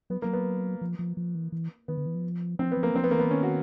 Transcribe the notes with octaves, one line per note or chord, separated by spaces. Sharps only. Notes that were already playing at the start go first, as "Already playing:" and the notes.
F#3 B3
F#3 A#3
B3
F3
F3
F3
E3
E3
D#3 B3
D3
E3
F3
F3 C4
B3
F3
A#3
F3 C4
B3
E3 A#3
B3
D#3 C#4
F#4